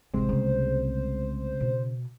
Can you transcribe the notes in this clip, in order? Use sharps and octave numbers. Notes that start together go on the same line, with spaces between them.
A1 C3 E3 G#3 C4 C5
C2 C#3 A3
B2